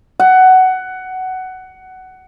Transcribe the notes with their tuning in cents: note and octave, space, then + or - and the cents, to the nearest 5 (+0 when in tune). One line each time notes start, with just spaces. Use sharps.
F#5 +15